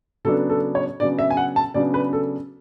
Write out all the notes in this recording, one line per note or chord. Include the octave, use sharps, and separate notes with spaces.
C#3 F#3 B3 D4 A4
A4
C#5
C#3 F#3 B3 D4 D5
E5
G#5
F#5
A5
C#3 F#3 B3 D4 D5
B4
A4